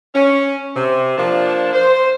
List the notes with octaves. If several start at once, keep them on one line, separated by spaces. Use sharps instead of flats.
C#4
C3
F3 A#3 D4
C5